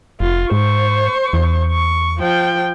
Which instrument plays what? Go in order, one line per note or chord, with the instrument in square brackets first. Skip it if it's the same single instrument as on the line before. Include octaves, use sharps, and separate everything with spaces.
[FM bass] F1 [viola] F4
[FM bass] G#2 [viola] C5 C#6
[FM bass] E2
[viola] C#6
F3 G5